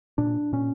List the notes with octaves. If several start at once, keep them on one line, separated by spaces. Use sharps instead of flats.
A#2 D4
A#2 C#4